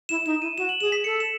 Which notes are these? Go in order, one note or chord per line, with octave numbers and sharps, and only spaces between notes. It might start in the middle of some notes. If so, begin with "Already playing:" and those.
E4 E7
D#4 E7
E4 D#7
F#4 E7
F#7
G#4 E7
B6
A4 C#7
E7